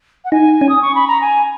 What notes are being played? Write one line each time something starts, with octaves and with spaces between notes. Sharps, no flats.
F#5
D#4 G#5
C#4
D#6
C#6
B5
A#5
G#5